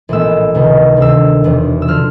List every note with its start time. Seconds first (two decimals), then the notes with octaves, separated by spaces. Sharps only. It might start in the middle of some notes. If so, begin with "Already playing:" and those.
0.09 A#1 A2 E3 G#3 B3 E6
0.55 C#2 C3 D#3 G#3
0.97 D2 C3 D#3 E6
1.44 E1 E2 C3
1.82 E6
1.88 D3 F3 F6